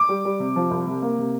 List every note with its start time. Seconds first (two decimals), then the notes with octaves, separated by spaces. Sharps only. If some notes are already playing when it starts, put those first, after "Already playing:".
Already playing: D6
0.09 G3
0.25 G3
0.40 C3
0.56 F3
0.71 C2
0.87 C3
1.02 A#3
1.18 C3